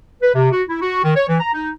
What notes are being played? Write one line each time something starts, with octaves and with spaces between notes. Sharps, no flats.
B4
C3
F#4
E4
F#4
D#3
C#5
E3
A#5
D#4